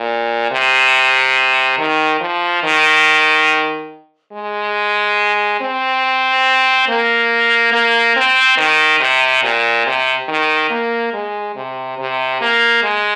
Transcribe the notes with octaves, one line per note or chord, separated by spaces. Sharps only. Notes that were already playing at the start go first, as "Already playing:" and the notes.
Already playing: A#2
C3
D#3
F3
D#3
G#3
C4
A#3
A#3
C4
D#3
C3
A#2
C3
D#3
A#3
G#3
C3
C3
A#3
G#3